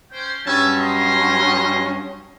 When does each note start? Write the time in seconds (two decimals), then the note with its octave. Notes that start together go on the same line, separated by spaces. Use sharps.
0.12 C#4 C5 G5
0.46 G2 F#3 C#4 E5 G#5 A5
0.77 D#5 C6